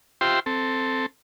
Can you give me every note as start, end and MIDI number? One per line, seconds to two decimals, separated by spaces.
0.21 0.40 65
0.21 0.40 67
0.21 0.40 72
0.21 0.40 76
0.21 0.40 79
0.21 0.40 84
0.46 1.06 60
0.46 1.06 69